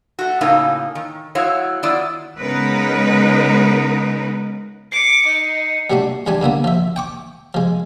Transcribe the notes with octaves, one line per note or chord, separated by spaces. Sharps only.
A3 F#4
A2 C#3 A#3 C#4 D#4 F4
D#3
F#3 G#3 E4 F#4 C#5 F5
D#3 B3 E4 F4 D5
C#3 G#3 B3 D#4 A#4 B4
D6 C7 C#7
D#4
F#3 G3 A3 D4 F#4
E2 E3 G3 D4 G#5
G2 D3 A#3 B3
F3 E5
G5 C#6 D6
F3 G#3